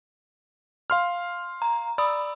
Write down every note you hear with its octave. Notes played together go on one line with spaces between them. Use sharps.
F5 C6 F6
A#5
D5 B5 D#6 E6